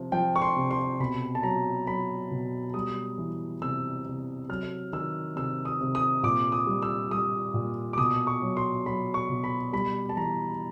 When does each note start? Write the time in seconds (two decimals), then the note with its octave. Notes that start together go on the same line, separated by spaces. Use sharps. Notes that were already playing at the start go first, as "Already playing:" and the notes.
Already playing: C3 F3
0.12 F3 G5
0.36 C#6
0.42 C6
0.57 C3
0.71 C6
1.00 B2 B5
1.35 A5
1.43 F#3 A#5
1.87 F#3 B5
2.31 B2
2.74 G3 D#6
3.18 E3
3.62 C3 E6
4.06 C3
4.49 F#3 F6
4.93 D#3 E6
5.36 C3 E6
5.65 D#6
5.81 C3
5.95 D#6
6.23 A#2 D6
6.52 D#6
6.67 G3
6.82 E6
7.11 G3 D#6
7.54 A#2
7.93 D6
7.98 B2 D#6
8.27 C#6
8.42 F#3
8.57 C6
8.86 F#3 B5
9.14 C#6
9.29 B2
9.44 B5
9.73 G3 B5
10.09 A5
10.16 E3 A#5